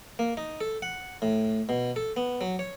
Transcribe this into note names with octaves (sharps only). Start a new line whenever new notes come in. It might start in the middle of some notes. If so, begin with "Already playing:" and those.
A#3
D#4
A4
F#5
A2
B2
A4
B3
F#3
C#5